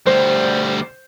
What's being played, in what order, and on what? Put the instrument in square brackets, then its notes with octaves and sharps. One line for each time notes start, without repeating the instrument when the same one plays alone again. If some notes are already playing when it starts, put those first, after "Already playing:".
[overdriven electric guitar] D2 G3 [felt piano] C5